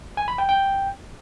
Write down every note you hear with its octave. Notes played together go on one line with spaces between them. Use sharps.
G#5
B5
G5
G5